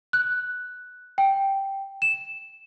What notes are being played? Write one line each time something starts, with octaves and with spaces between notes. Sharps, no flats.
F#6
G5
E7